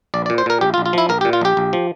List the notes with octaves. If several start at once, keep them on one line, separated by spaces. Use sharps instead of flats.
A#1 D5
D5
A#2
C5
A#2 A#4
A#1 G4
F4
A#1
F4
F3 E4
A#1 A#4
G4
A#2
F4
A#1 G4
A#1
F3